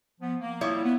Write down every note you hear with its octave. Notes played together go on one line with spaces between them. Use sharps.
F3 B3
A#3
F3 G3 A#3 E4 C#5
B3